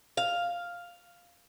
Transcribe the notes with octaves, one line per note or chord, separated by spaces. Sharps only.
F5